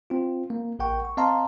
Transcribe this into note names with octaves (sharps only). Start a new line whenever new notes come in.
C4 F4
A#3
A1 A#4 F#5 G5 C#6
C#6
C4 D#5 F5 A5 A#5 C6